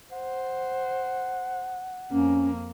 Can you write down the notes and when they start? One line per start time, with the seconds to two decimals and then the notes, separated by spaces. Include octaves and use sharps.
0.13 C5 F#5
2.11 F2 A#3 C#4